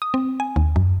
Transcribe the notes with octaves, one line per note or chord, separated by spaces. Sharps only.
D#6
C4
G#5
D#2
F#2